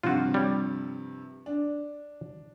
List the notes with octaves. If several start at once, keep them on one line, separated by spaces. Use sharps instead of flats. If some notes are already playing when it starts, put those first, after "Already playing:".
G2 C3 F3 F4 F#4
G3 C#5
D4